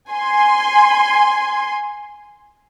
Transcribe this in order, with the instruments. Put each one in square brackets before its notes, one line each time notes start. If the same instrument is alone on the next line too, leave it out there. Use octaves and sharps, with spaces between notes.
[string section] G#5 C6